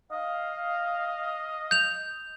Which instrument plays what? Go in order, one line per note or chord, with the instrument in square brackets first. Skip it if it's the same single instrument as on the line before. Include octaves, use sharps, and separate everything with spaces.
[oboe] D#5 [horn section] F5
[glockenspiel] G6 F7